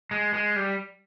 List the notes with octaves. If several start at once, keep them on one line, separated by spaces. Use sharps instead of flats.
G#3
G#3
G3